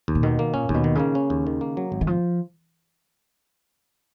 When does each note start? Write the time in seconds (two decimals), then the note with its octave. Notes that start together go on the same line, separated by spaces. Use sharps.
0.08 D#2
0.15 A#2
0.23 B2 D#3
0.39 A#3
0.54 A#2 C#4
0.69 D#2 A#2
0.74 B2
0.84 D#3
0.95 C#3 A#3
1.15 C#4
1.30 D#2
1.47 D#3
1.61 A#3
1.77 F#3
1.92 G#1
2.01 D#3
2.07 F3